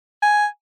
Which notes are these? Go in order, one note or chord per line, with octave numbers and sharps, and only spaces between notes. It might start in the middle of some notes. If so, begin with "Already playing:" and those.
G#5